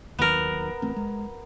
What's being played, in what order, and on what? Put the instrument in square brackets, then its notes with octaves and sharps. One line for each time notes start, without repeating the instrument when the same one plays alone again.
[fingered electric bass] D#2 D#3 F#3 [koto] B3 A#4
[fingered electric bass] A1 A3 C4
G#3